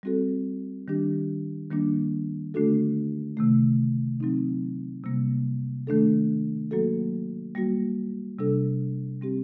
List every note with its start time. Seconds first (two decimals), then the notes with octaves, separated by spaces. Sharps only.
0.03 G3 C4 F#4 A4
0.88 D#3 G3 D4 G4
1.71 D#3 G3 A#3 D4
2.54 D3 A3 D4 F#4 A4
3.37 C3 D#3 A3
4.20 F#3 C4 D#4
5.04 C3 G3 A#3
5.87 D#3 A3 D4 A4
6.71 F#3 A#3 F#4 A4
7.55 G3 A#3 F#4
8.39 C3 G3 D4 A4
9.22 G3 C4 G4